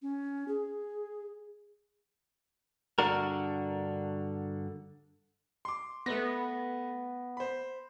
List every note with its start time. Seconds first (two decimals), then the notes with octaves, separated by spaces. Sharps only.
0.02 C#4
0.48 G#4
2.99 G2 D3 D4 F#4 A#4
5.65 C6 D6
6.06 A3 B3 B4 A#6
7.37 C5 B5